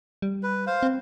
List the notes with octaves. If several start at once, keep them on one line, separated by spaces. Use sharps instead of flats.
G3
B4
C5 F5
C4